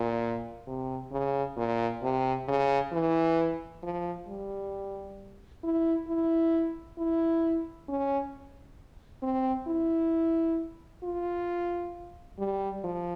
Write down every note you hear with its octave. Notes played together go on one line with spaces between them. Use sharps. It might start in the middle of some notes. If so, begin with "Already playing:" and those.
Already playing: A#2
C3
C#3
A#2
C3
C#3
E3
F3
G3
E4
E4
E4
C#4
C4
E4
F4
G3
F3